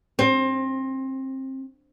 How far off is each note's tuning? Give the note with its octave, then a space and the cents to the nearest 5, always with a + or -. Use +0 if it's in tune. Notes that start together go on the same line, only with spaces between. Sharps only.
C4 +25